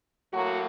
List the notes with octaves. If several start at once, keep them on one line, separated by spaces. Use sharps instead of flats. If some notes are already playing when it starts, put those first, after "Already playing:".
A2 F#3 A#3 F#4